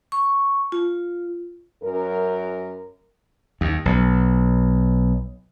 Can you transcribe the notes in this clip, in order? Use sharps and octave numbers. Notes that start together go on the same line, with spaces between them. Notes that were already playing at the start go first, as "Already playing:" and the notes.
C#6
F4
F#2 A#4
D#2
B1